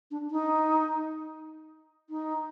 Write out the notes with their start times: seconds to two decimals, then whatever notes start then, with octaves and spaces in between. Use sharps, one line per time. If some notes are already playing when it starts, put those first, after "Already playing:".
0.11 D4
0.31 D#4
2.10 D#4